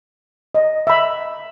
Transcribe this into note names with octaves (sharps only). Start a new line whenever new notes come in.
D#5
E5 B5